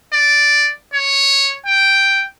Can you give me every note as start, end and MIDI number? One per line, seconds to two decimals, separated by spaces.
0.13 0.71 74
0.94 1.57 73
1.66 2.26 79